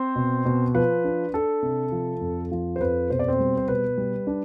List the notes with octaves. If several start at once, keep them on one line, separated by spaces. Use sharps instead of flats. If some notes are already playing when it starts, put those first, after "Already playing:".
Already playing: C4 C5
B2
B2
F3 B4
D4
D4 A4
C3
F3
F2
F3
C5
F2 B4
B2 C5
D5
C4 C5
G3
C5
B2 B4
G3
D4